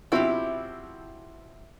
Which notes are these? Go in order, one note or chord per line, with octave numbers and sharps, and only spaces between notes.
B2 F3 C4 E4 G4